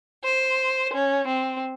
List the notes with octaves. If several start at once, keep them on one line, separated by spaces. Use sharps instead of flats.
C5
C#4
C4